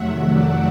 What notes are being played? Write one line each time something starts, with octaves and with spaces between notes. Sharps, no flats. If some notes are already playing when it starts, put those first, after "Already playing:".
Already playing: F2 C3 D#3 F#3 A3 E5 F#5
D5 E5